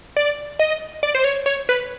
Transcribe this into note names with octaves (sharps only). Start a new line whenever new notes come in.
D5
D#5
D5
C5
C#5
C#5
B4